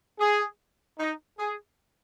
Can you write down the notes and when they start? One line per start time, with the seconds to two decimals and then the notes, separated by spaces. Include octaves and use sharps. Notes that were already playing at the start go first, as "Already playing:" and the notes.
0.20 G#4
0.99 D#4
1.39 G#4